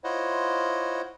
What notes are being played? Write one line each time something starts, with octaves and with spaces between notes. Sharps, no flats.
E4 F4 C5 C#5 D#5 F#5